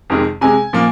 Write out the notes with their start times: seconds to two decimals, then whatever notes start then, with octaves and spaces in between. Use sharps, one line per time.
0.10 F2 C3 D#3 G#3
0.41 C3 G#3 G#5
0.73 A#2 F3 A#3